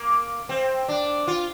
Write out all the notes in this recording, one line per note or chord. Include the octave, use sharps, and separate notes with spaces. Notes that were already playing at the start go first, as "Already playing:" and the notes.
Already playing: A#3
C4
D4
F4